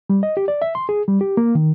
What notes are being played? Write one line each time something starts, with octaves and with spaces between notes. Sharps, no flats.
G3
D#5
G4
D5
E5
C6
G#4
G3
G4
A#3
D#3